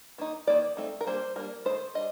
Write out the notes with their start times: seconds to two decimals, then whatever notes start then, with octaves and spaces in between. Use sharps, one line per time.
0.18 D#3 A#3 D#4
0.47 D#3 A#3 D#4 D5
0.77 A3 C4 D#4
1.01 A#4
1.07 G3 A#3 D4 C5
1.36 G3 A#3 D4 A#4
1.65 D#3 A3 D#4 C5
1.95 G3 D4 D#5